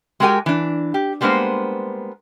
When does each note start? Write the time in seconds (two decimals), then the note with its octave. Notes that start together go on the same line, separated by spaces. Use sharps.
0.20 G#3 F#4 G4 A#4 G5 G#5
0.46 E3 D4
0.94 G4
1.21 G3 G#3 A#3 B3 D4 C5